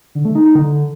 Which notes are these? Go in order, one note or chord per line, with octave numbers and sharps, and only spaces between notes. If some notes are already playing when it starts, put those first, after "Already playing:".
D3
A3
D#4
D#4
D3